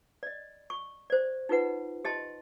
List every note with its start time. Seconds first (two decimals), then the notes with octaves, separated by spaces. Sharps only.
0.23 D5 D#5
0.70 C#6
1.10 C5 D5
1.49 D#4 F4 G4 B4 F#5
2.05 G4 D#5 A5 C6